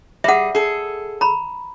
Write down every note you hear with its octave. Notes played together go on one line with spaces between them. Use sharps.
G3 G#4 E5 F#5
G#4 A4
A#5 B5